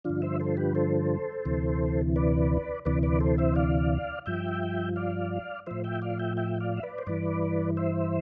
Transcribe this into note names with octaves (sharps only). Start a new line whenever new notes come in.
G2 D3 F3 D4 F4
C5 E5
A4 C5
G4 B4
A4 C5
D2 C3 E3
B4 D5
D2 C3 E3 B4 D5
B4 D5
A4 C5
C5 E5
D5 F5
G2 F3 E5 G5
D5 F5
A2 F3 C5 E5
E5 G5
D5 F5
E5 G5
E5 G5
D5 F5
E5
B4 D5
C5
G2 E3 B4 D5
C5 E5